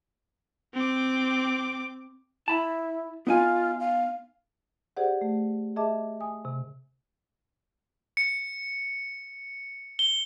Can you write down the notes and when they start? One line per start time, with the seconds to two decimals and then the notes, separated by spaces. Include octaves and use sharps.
0.74 C4 D6
2.48 E4 A5 B5
3.27 B3 D#4 F4 G#5
3.80 F5
4.97 G4 G#4 C5 D5 F#5
5.21 A3
5.76 G#4 D#5 E5 A5 D6
6.21 G#5 D#6
6.45 C3
8.17 C#7
9.99 G7